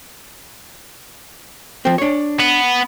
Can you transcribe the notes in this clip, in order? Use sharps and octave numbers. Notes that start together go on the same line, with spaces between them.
F3 C4
D4 C#5
B3